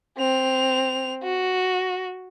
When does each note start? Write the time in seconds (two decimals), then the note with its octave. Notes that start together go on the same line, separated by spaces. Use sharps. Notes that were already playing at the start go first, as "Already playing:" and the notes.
0.18 C4 F7
1.23 F#4